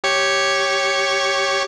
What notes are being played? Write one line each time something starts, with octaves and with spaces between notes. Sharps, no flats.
G4 C#5 C#6